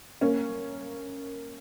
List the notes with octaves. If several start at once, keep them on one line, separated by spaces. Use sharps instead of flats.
A#3 C#4